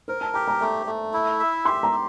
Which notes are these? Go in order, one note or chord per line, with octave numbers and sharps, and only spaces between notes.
A#4 C5
A5
G4 A#5
A#5
A3 A#5
A3
E4
E5
G4 C6
A#5
G4